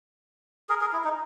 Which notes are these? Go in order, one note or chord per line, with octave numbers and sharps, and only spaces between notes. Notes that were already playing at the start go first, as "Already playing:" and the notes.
G#4 A#4
G#4 A#4
E4
D#4